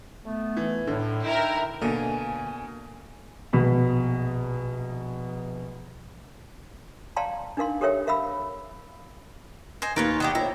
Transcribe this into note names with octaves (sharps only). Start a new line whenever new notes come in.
A3 B3
E3
A2 D3
D#4 E4 A#4 G5
B2 D3 A#3 G#5
A#1 B2 B5
D5 F5 G5 A5 A#5 C6
D4 D#4 A#4 F5 C6
G4 A4 A#4 C#5 E5 G5
A#4 E5 F5 B5 E6
C5 D#5 G#5
D#2 D#4 F4 A#4 B4 C#5
D#3 D4 G4 F#5 C#7
E4 F4 C5 C#5 A#5